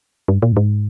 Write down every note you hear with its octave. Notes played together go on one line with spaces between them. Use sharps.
G2
A#2
G2
G#2